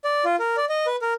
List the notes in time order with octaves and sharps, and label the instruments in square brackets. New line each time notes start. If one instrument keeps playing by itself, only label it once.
[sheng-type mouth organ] D5
F4
A#4
D5
D#5
B4
A#4